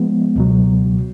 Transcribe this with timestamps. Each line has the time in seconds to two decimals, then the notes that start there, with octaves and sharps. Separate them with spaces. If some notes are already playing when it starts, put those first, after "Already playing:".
Already playing: F3 G#3 B3
0.36 C#2 B2 F#3